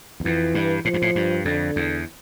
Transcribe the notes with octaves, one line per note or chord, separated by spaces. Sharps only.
E2
F2 E3
G2
A2 F3
G2
A2
G2
F2 D3
E2